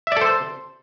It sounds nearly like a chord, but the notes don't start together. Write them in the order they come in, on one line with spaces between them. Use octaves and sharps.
E5 D5 A4 C5